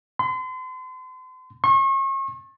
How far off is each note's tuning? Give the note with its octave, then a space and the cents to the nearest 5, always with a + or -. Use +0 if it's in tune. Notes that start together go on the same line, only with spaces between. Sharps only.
C6 -40
C#6 -40